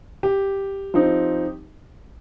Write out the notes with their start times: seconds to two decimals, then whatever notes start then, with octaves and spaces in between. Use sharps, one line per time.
0.23 G4
0.94 F3 C4 D#4